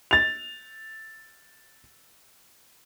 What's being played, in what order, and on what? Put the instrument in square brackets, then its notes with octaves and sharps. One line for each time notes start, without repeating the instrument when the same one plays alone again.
[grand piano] A6 F7